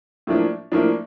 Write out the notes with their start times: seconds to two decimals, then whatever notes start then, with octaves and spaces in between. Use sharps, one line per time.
0.27 A2 F3 A#3 D4
0.72 A2 F3 A#3 D4